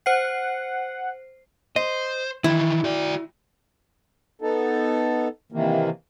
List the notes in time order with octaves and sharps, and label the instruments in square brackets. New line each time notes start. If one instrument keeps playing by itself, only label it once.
[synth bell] C5 C7 [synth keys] F#5
[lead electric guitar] C5 [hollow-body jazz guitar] D#5
[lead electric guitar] D#3 E3 [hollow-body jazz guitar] E4
[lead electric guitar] F#4 D5
[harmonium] B3 D#4 A4
C3 D#3 E3 A#3